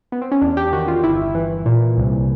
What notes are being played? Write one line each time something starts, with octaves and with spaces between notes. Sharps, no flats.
B3
C4
C#4
E2 D4
G4
D#3 F#4
F4
G1 E4
E3
A#2
C2